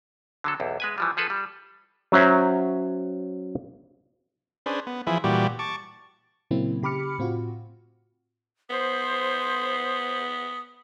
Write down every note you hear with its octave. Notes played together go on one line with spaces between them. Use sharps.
D3 F#3 A4
B1 E2
G#3 B4 G#5
E3 F3 G3
F3 G#4 A4 B4
G3
F#3 C#4 C5 E5 A#5
C#4 D4 G#4 B4 C5
B3
E3 F3 E4 G#4
A#2 E3 G3 F#4 G4
A5 C#6 D6
A#2 C#3 F#3 A#3 C4 E4
C#3 G4 B5 D6 F6 C#7
A2 C4 F4 F#4
B3 C5 D#6